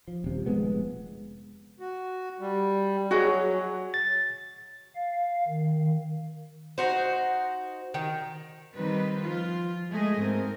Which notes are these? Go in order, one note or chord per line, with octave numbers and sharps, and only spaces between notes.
F3
D#1 C3
F1 G#3 B3
F#4
G3
F#3 F#4 G#4 D#5
A6
F5
D#3
D#4 F#4 C5
D#3
D#3 G3 C4 D#4 B4
F3 F4
G#3 A3 G#4 D#5
G#2 C4 A#4